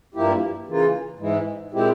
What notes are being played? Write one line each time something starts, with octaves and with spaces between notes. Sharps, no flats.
G2 F3 A#3 E4 G4
C#3 E3 A#3 F4
G#2 E3 G#3 E4
A#2 G#3 C4 E4 G4